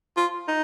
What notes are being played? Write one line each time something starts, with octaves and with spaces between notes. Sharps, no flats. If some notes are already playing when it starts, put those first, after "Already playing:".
F4
D#4